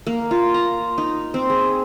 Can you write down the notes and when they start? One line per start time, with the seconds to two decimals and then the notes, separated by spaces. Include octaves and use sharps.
0.07 A#3
0.31 F4
0.54 A#5
0.98 D#4
1.34 C4
1.50 G#4